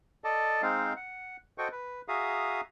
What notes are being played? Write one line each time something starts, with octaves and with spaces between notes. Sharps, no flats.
A4 D5 D#5 A5
G#3 C4 D#4 C5 F5
F#5
F#4 A4 C5 D#5 G5 C#6
B4
F#4 G#4 E5 F5 A#5 D#6